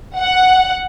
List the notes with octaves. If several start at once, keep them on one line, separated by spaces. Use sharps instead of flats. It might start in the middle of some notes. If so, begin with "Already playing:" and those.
F#5